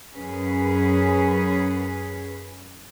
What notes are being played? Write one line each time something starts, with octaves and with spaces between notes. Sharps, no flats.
F#2 C#4 G#4 B4